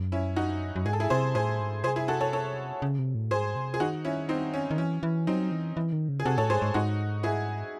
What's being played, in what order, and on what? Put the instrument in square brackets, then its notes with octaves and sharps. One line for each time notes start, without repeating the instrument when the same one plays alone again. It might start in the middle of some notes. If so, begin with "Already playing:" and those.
Already playing: [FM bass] F#2
[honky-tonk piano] C#4 E4
D#4 F#4
[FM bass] F#2
[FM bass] G#2 [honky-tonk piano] G#4
[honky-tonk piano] A4
E4 G#4
[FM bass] C3 [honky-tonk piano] G#4 C5
[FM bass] A2 [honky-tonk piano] G#4 C5
[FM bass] G#2
[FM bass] C3 [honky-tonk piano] G#4 C5
[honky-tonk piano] E4 G#4
F#4 A4
A4 C#5
A4 C#5
[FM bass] C#3
C3
A2
[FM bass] G#2 [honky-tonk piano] G#4 C5
[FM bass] C3
[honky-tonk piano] G#4
[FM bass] D#3 [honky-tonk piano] D#4 F#4
[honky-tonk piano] C#4 E4
C4 D#4
C#4
[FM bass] D#3
[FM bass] E3 [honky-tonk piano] C#4
[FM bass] E3
[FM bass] F#3 [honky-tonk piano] C4 D#4
[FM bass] E3
E3
D#3
C#3
[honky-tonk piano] G#4
[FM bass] C3 [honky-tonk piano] F#4 A4
[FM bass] A2 [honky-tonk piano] A4 C#5
[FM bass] G#2 [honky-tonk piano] G#4 C5
[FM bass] G#2
[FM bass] G#2 [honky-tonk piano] D#4 F#4
[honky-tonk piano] E4 G#4